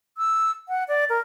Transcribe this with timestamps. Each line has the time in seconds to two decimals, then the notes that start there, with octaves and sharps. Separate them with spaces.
0.17 E6
0.68 F#5
0.88 D5
1.09 A#4